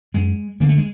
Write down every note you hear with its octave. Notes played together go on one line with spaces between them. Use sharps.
F#2 G#3
D3 A#3
A3
G#3